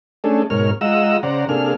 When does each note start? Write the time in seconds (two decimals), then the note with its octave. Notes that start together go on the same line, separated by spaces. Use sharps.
0.24 A3 C#4 D4 G#4 A4
0.50 G#2 B2 A#4 C#5 F6
0.81 G#3 F4 D#5 F#5 A#5 E6
1.23 C#3 C5 D5 F#5 A#5
1.49 C3 A#3 D4 G#4 A4 F6